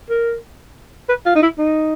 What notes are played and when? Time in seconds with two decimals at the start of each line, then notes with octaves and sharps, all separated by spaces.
0.10 A#4
1.09 B4
1.26 F4
1.36 D#4
1.43 E4
1.58 D#4